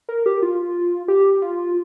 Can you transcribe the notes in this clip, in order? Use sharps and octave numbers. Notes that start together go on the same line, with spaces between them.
A#4
G4
F4
G4
F4